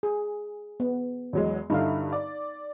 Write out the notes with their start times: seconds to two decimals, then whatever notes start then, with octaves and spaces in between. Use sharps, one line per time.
0.03 G#4
0.80 B3
1.33 E2 F#3 G#3
1.70 G2 D3 D#4 E4 F5
2.13 D5